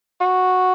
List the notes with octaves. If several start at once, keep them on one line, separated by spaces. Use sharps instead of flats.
F#4